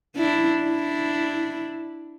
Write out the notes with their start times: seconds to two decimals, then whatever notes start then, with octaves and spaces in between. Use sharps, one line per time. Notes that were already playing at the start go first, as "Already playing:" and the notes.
0.16 D4 E4
0.62 D4 E4